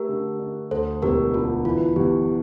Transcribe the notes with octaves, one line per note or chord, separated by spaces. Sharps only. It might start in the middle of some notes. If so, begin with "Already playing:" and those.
Already playing: A3 G4 A#4
D3
D4
D2 A4 C5
E1 G4 A#4
D3 F4
E3 F4
E2 G4